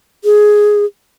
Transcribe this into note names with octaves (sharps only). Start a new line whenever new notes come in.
G#4